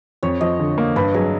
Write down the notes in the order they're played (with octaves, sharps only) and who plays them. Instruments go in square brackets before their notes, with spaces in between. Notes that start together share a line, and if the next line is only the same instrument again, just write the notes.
[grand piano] F2 [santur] C#5
[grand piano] F3 [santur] D#5
[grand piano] D3
A#3
[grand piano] G2 [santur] B4
[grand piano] F#3 [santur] G#4